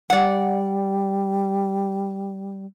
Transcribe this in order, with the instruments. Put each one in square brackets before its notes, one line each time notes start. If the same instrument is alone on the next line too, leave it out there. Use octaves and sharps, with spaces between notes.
[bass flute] G3 [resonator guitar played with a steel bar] D5 F#5